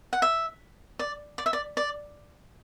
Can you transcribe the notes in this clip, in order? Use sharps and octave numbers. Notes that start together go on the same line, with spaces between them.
F#5
E5
D5
D5
E5
D5
D5